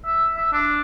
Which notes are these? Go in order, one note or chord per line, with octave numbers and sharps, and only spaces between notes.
E5
E5
D4